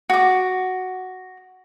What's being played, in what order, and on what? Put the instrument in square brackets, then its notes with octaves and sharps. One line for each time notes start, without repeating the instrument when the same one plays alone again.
[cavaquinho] F#4 D6